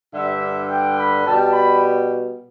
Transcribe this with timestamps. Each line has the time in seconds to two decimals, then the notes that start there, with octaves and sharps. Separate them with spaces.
0.12 G2 D3 G3 E5
0.69 G5
0.97 B5
1.25 B2 G3 A5
1.53 B5